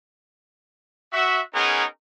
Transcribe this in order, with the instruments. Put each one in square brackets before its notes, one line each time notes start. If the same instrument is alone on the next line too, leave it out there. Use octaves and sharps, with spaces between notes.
[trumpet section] F#4 E5
B3 C#4 D#4 G#4 A#4